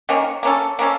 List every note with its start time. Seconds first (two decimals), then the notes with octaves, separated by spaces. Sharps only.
0.09 D#3 A#3 C#4
0.43 A#3 C#4 A4
0.79 A#3 C#4 A4